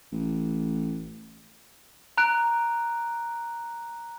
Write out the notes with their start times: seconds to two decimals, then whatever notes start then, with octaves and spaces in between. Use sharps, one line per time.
0.12 A1
2.18 A#5 F#6 D7